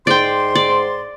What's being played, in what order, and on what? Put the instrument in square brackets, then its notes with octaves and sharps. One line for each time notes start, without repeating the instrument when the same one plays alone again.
[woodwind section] G#2 C6 [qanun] D5 G5
[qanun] D5